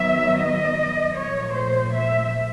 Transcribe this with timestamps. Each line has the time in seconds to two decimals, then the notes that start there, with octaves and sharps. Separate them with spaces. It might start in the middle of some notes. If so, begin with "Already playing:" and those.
Already playing: D#3 F#3 B3 E5
0.40 D#5
1.17 A#2 F3 A3 C#5
1.56 C5
1.94 E5